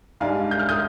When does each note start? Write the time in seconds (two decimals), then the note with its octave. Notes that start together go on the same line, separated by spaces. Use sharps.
0.21 G#2 G3 D4 F5 G#5
0.51 G6
0.59 F6
0.69 D#6 G6